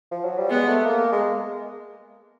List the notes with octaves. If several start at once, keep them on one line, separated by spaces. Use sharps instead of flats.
F3
F#3
G3
G#3 B3
A3
A#3
G#3